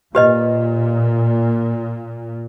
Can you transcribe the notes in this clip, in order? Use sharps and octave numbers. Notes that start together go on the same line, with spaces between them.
A#2 G4 B4 D#5